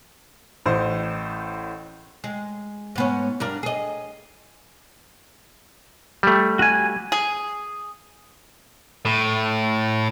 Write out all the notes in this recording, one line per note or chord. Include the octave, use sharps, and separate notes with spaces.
A1 A2 C5
G#3
G#2 B3 C#4
G2 D4 A#4
G#4 D#5
G3 A3
F#4 G#5
G#4
A2